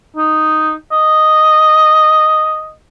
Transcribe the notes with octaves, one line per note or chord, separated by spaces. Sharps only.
D#4
D#5